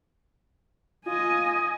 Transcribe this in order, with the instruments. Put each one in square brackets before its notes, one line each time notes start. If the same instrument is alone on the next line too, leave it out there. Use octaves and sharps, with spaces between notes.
[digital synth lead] F4 [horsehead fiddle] D#5 G#5